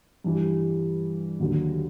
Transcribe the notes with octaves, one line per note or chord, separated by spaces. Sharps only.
G2 E3 G3
D#2 D3 F#3